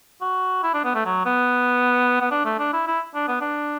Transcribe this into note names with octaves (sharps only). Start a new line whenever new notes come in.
F#4
E4
D4
B3
A3
F#3
B3
B3
D4
A3
D4
E4
E4
D4
B3
D4